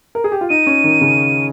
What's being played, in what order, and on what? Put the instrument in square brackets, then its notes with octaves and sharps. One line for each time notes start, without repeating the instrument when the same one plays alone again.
[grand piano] A#4
G#4
G4
F4
[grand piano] D#4 [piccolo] D#7
[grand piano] C#4
D#3
C#3